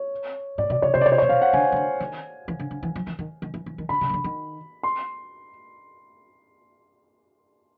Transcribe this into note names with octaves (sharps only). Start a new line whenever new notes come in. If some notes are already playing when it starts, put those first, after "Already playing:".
Already playing: C#5
A2 D5
B2 D5
C#3 C#5
C3 C5
D5
C3 C#5
C5
C#5
A#2
B2 F5
F#5
D3 G#5
D#3
D3
D#3
E3
D3
D3
E3
F3
E3
D#3
D#3
E3
E3
D#3
D3 B5
C#3
D#3
D3
D#3
C6